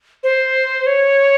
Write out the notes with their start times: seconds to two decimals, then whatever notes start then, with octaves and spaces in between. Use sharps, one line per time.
0.23 C5
0.86 C#5